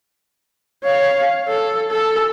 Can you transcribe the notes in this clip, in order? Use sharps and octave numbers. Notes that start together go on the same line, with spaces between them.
C#5 F5
A4
A4